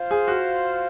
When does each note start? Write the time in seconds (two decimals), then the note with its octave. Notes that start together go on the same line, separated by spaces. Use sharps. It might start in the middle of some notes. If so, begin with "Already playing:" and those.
Already playing: F4 C5 F5
0.11 G#4
0.28 F#4